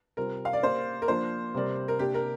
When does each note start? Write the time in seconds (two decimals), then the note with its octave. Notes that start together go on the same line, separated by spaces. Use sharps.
0.17 C3 G3 C4 F4 A#4 C5
0.45 F5
0.53 D5
0.63 A#3 G4 A#4 C5 F5
1.02 A#4
1.08 F3 A#3 D4 F4 C5
1.55 C3 G3 C4 A#4 D5
1.88 A#4
1.99 C3 A#3 D4 G4
2.14 A#4